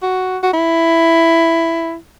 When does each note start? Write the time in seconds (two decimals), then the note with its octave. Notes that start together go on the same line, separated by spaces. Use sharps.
0.02 F#4
0.43 F#4
0.53 E4